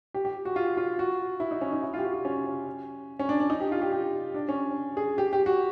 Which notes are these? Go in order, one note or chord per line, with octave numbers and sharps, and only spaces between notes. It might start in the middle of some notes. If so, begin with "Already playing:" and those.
G4
G4
F#4
F4
F4
F#4
E4
D#4
C#4
D#4
E4
F4 G4
F#4
F4
C#4
C#4
D4
D4
D#4
G4
F4
G4
G4
D4
C#4
G#4
G4
G4
F#4